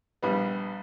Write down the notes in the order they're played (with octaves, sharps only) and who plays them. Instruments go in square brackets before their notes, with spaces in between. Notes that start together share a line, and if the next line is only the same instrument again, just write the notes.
[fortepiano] A#1 G3 B3